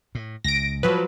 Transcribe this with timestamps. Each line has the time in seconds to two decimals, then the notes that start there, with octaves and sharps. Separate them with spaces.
0.15 A2
0.44 C#2 A#6 D7
0.83 F3 F#3 B4